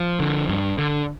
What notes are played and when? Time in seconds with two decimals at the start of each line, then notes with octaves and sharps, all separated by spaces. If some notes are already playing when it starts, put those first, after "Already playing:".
Already playing: F3
0.20 D3
0.49 G2
0.78 D3